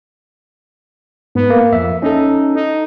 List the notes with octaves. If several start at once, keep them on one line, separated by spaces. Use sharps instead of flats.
G#2 B3
A#3
F2 E5
C#4 D#4 A4
D#4